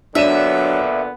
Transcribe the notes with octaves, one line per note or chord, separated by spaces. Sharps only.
A#2 D3 F#3 B3 D4 E5 D#7 E7